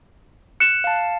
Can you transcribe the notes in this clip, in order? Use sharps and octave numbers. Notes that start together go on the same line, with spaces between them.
F#6 C#7 E7
F5 A5